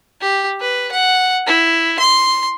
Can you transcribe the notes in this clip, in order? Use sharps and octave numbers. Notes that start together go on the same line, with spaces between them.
G4
B4
F#5
E4
C6